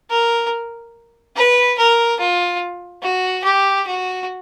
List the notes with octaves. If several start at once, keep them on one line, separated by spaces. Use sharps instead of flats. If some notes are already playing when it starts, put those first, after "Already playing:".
A#4
B4
A#4
F4
F#4
G4
F#4